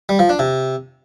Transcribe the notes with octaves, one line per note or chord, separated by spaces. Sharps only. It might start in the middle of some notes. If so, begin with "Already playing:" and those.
G3
F3
D4
C3